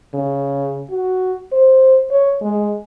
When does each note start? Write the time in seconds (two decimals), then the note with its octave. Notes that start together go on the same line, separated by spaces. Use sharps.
0.14 C#3
0.90 F#4
1.52 C5
2.11 C#5
2.41 G#3